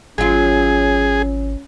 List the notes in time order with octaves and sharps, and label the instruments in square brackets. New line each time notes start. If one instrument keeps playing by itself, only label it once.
[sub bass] G#1 [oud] F#3 F4 [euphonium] C#4 [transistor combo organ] G#4